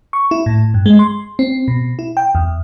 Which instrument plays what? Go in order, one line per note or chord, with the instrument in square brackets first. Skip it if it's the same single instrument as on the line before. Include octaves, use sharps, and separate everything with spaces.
[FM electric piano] C#6
E4
A2
G2
G#3
C6
C4
B2
E4
G5
E2